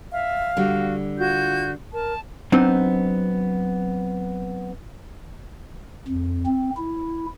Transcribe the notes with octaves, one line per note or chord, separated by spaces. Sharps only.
E5 F5
D3 G3 F#4
F4 F#4 G6
A#4 A5
F#3 B3 C4 D4 D#4
F2
C4
E4